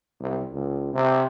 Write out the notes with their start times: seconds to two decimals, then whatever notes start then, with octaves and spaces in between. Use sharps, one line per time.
0.20 C2
0.51 C#2
0.94 C3